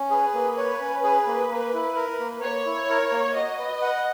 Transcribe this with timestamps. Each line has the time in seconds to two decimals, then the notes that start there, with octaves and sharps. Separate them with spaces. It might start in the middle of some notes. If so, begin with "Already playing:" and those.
Already playing: C#4
0.10 G#4 B4
0.34 A#3
0.57 C#5
0.81 C#4
1.04 G#4
1.27 A#3
1.51 A#3
1.74 E4
1.96 A#4
2.20 A#3
2.43 A#3 C#5
2.66 E4
2.89 A#4
3.12 A#3
3.36 F#4 D#5
3.58 B4
3.82 F#5